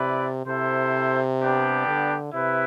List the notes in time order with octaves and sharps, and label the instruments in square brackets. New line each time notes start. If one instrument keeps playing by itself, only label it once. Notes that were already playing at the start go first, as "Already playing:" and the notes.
Already playing: [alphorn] C3 [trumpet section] E4 B4 D5
[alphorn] C3 [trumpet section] E4 A4 C5
[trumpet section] G3 B3 D4 G4
[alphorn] D3
[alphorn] C3 [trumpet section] E4 B4